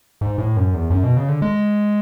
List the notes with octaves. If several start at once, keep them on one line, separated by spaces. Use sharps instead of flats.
G#2
A2
F#2
E2
F#2
B2
C#3
D3
G#3